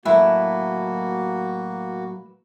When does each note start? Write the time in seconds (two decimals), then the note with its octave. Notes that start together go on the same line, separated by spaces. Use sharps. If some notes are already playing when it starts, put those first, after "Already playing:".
0.05 A2 F#3 A#3 E4 F#4 A4 B4 G#5